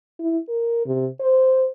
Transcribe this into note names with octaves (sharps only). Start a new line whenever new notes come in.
E4
A#4
C3
C5